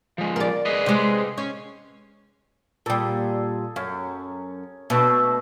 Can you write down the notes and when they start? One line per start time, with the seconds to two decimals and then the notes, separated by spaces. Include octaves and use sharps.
0.18 F3 G#3
0.36 A#4 D5
0.65 G#4 B4 D#5
0.86 C3 G#3
1.38 C#4
2.86 A#2 G3 G#4 A4
3.76 F#2 C#4
4.90 B2 A3 D4 E5